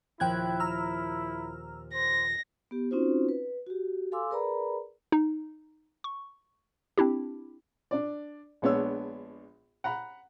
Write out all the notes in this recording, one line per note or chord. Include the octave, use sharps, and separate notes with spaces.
D#2 A#2 F3 E4 G5 F#6 G#6
A#5 E6 F6
C5 A#6
B3 G4
C4 C#4 D#4 F4 F#4 C5
B4
F#4 G4
A4 F5 G#5 C6 D6 E6
G#4 A#4 B4 D5 A#5 B5
D#4
C#6
C4 D4 E4 G4
D4 D5
A#1 G#3 B3 D4 C#5 E6
F#5 A#5 B5